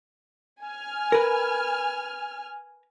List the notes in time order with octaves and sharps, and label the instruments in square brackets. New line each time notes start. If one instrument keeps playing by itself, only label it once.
[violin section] G#5 F6
[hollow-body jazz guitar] A#4 B4